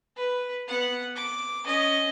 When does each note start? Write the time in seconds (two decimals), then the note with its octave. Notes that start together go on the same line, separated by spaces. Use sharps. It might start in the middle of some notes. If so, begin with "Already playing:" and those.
0.16 B4
0.67 B3 F#5
1.16 D6
1.65 C#4 D#5